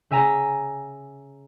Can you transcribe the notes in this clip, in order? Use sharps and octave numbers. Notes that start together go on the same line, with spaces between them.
C#3 E5 G#5 A#5